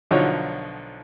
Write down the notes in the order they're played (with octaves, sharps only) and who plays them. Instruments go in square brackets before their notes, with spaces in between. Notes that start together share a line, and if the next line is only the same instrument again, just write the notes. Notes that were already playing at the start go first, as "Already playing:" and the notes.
[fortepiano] B1 D3 F3 D#4 F#4 C#5